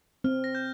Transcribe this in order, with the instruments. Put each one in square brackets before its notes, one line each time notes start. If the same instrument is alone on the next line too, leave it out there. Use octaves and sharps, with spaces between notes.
[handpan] C4 [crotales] F6
[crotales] A#6
G6